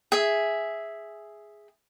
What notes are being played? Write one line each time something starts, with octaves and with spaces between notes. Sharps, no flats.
G#4 E5